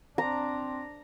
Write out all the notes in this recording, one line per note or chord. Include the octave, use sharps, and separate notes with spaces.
C4 D4 A#5